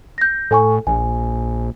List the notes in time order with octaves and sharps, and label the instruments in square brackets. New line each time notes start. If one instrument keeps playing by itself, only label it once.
[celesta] G6 A#6
[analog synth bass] A2 [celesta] A4 G#5 C#6
[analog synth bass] A#1 [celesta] G#5